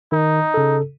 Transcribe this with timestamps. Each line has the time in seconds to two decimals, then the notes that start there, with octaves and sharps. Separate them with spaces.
0.12 D#3 D#4
0.54 C#3 A4